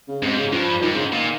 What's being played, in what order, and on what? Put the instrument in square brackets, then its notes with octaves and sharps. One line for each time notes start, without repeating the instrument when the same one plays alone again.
[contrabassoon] C#3
[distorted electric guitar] G#2 [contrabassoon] C3
[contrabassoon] C#3
[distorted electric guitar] G2 [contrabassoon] F3
[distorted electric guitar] G#2 [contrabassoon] D#3
[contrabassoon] C#3
D#3
[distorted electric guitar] A#2